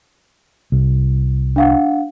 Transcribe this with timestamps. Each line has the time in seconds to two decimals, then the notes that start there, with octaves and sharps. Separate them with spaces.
0.72 C2
1.56 D4 F5 F#5